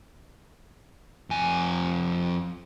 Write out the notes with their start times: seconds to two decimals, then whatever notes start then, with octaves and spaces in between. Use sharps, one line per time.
1.30 F2 G#5